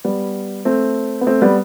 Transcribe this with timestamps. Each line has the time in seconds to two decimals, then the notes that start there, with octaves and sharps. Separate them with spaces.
0.04 G3 B3
0.65 A3 C4
1.21 B3
1.27 A3 C4
1.42 G3 B3